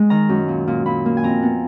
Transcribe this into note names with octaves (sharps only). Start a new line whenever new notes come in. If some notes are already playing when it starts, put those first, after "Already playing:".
Already playing: G#3
D#3 A#5
F#2
A#2
A#2
A#2 B5
A#3
G#5
F2 A#5
B3